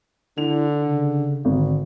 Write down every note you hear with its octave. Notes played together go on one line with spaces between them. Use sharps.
D3 E4 F7
C#3
G#1 D3